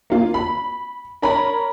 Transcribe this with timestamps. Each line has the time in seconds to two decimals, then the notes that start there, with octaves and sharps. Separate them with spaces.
0.10 A#3 F4
0.34 B5
1.22 A#4 C#5 A#5 B5